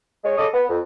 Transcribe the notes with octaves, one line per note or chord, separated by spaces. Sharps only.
G#3 C#5
C#3 A4 D#5 D6 D#6
B3
F2